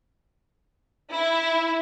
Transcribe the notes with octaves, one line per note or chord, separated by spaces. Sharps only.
E4